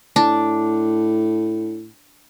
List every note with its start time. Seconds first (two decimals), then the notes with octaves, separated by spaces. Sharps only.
0.16 A2 D4